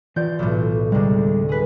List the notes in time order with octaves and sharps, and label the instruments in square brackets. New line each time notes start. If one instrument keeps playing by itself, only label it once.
[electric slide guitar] E3 F4 D5 [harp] G6
[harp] B1 A2
[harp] D2 C3 [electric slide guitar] G3 G#3
[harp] G#4 B4